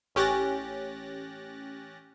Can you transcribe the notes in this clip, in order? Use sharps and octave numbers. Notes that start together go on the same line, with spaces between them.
A1 C#4 G4 F#6 A6 A#6